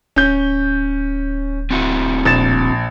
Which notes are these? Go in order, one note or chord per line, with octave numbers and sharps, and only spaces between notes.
D1 C#4 G6
C4 E4 F#4
A#1 A6 E7